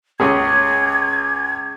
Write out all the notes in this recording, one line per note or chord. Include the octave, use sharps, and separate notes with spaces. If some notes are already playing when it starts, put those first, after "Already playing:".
C#2 C#4 G#4 G#6